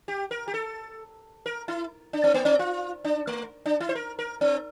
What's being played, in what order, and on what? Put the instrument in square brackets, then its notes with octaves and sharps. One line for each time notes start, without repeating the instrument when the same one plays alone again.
[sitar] G4
A#4
G4
A4
A#4
E4
D4
C4
A#3
C4
F4
D4
A3
D4
E4
C5
A#4
A#4
C4